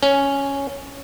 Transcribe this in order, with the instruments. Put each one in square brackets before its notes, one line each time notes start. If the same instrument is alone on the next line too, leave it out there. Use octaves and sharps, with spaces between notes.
[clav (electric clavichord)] C#4